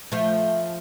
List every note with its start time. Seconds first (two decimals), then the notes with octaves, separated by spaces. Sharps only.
0.12 F3 A3